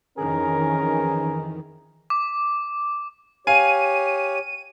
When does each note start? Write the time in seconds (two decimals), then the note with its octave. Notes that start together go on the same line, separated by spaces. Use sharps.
0.18 F2 D#3 E3 C#4 G#4 A#4
2.10 D6
3.47 G4 C#5 F5 G#5 D#7